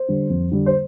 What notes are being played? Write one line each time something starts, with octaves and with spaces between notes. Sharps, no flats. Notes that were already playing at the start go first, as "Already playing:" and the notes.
Already playing: C5
D3 G3
F2
D3 G3
C5